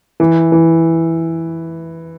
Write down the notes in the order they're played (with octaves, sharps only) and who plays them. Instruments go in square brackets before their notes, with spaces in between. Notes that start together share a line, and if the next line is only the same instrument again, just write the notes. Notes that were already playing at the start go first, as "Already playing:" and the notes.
[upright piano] E3
E3